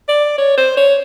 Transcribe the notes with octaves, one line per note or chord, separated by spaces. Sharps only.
D5
C#5
C5
C#5